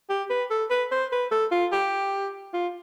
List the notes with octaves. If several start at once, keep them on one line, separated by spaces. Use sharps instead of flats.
G4
B4
A4
B4
C5
B4
A4
F4
G4
F4